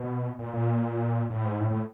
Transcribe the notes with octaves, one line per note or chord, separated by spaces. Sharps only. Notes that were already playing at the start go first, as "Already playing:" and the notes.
Already playing: B2
A#2
A#2
A2
G#2
A2
A2